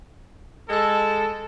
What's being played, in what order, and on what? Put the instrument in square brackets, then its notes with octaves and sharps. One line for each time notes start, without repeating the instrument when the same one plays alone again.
[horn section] G#3 A4